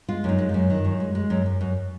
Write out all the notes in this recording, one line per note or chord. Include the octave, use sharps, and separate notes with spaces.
G#3 F4
F#2 D#4
G#3
F#2 F4
D#3
F#2
G#3
G#3
F#2
F#2
F#2